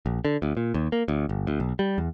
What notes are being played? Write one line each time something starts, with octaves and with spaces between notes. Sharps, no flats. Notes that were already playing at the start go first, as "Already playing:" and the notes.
A#1
D3
D2
A#2
D#2
A#3
D2
G1
D2
B1
G3
E2